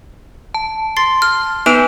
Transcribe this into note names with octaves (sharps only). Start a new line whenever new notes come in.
A5
C6 A6 C7
F6
B3 D#4 B4 D7 E7 F7